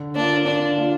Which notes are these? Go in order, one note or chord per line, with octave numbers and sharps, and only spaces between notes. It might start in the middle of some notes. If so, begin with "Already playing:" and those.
Already playing: D3
A#3 D4 F4
D3 D4
A#3 F4